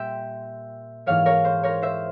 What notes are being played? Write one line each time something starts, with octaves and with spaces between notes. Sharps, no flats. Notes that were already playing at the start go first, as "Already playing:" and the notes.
Already playing: A#2 G3 E5 G5 C6
G#2 E3 A#3 C#5 F5
A#4 C#5
C5
A#4 C#5
C5 E5